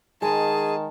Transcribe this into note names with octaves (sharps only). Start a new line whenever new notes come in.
D#3 G#3 G#4 A5